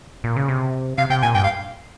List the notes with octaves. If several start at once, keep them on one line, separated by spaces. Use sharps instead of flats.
A#2
C#3
C3
C3 F5
C3 G5
A#2 G#5
G2 G5
F5